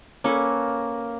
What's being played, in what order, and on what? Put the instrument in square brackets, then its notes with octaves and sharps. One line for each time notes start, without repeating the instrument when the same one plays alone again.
[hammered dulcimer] A#3 [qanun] C#4 A4 B4